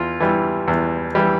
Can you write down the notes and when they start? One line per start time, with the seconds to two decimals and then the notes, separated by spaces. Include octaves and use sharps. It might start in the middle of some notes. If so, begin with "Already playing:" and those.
Already playing: E2 F4
0.20 E3 G3
0.68 E2
1.15 E3 G3